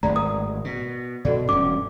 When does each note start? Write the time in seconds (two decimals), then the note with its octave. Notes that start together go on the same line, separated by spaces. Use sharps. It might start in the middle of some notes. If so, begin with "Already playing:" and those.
0.03 G#1 A2 G#3 D5 A#5
0.16 A#4 D#6
0.65 B2
1.25 B2 F#4 A4 D5
1.49 E1 G2 C#4 D6